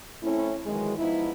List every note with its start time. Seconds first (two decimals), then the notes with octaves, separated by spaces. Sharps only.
0.23 A3 C4 C#4 E4
0.66 D#3 E3 F#3 G#3
0.97 G#2 F3 B3 D#4 E4